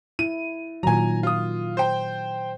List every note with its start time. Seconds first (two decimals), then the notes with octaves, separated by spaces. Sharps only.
0.19 E4 D#7
0.83 A#2 D#3 F#3 G#5 A#5
1.23 F4 D#6
1.77 C5 G5